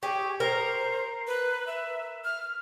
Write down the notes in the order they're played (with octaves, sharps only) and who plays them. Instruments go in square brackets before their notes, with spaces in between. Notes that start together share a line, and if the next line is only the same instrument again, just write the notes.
[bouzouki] G4 G#4 [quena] C#6
[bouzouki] A#4 [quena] C5
[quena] B4
E5
F6